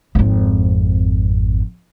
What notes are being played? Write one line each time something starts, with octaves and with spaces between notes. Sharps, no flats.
G#1 F2